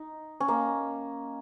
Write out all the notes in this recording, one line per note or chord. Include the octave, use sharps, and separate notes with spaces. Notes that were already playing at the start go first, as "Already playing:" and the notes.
Already playing: D#4
C#4
A#3